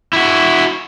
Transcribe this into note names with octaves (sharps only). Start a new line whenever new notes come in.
E4 F#4